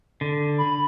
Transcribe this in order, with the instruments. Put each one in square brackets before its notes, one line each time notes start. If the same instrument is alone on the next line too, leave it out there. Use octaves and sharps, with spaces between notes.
[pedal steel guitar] D3
[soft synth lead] B5